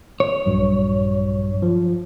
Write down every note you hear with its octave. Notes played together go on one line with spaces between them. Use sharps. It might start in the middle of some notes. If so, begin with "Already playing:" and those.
C#5
A#1 G2 F#3
F3